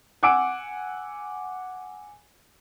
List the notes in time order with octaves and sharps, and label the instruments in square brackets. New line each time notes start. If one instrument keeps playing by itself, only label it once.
[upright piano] F#5 G#5 D6 E6 D7